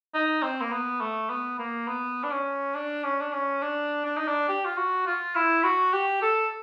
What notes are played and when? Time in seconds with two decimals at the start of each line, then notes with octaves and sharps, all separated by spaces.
0.14 D#4
0.43 C4
0.61 A#3
0.72 B3
1.00 A3
1.30 B3
1.59 A#3
1.88 B3
2.23 D4
2.31 C#4
2.75 D4
3.04 C#4
3.21 D4
3.33 C#4
3.62 D4
4.05 D4
4.17 D#4
4.28 D4
4.49 G4
4.65 F4
4.77 F#4
5.06 F4
5.35 E4
5.64 F#4
5.93 G4
6.22 A4